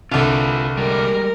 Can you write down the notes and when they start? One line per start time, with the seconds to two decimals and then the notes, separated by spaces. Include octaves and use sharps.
0.12 C2 D3 F4 B4
0.77 G3 G#3 A#4